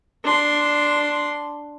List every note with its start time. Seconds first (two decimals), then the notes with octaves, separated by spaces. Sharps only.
0.24 D4 C6